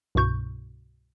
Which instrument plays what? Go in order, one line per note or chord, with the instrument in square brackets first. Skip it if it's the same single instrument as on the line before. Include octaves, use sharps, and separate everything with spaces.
[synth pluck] C2 G2 B2 C#6 G6